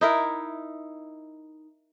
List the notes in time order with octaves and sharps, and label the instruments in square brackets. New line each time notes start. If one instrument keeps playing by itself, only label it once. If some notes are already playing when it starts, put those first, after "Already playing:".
[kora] D#4 E4 A#4